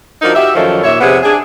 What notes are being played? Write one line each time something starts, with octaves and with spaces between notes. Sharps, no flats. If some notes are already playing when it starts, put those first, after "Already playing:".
F3 D4 D#4 F#4 A#4
F#4 G4 E5
F#2 D#3 F3 A4 C#5
D#2 A#2 C#5 E5
F2 C3 B3 G#4 F#5
D4 G#4